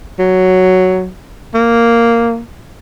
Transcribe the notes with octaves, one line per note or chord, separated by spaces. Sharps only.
F#3
A#3